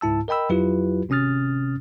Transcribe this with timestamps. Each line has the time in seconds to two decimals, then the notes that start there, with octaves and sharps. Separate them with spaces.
0.01 C#2 G#2 E4 A5 E6
0.28 A#4 D#5 G5 B5 E6
0.49 F2 F#3 E4 F4 G4 B4
1.09 G#1 C3 C#4 D#6 F6 A6